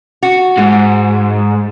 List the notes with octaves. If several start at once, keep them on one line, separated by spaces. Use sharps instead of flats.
F#4
G#2